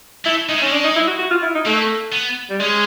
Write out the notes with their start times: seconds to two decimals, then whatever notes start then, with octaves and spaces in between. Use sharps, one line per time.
0.25 A3 E4
0.48 G#3 D#4
0.58 A3 C#4
0.67 G#3
0.72 D4
0.84 D#4
0.96 E4
1.07 F#4
1.19 F#4
1.31 F4
1.43 E4
1.55 D#4
1.66 A3 A#3
2.13 B3
2.50 G3
2.60 G#3 C#4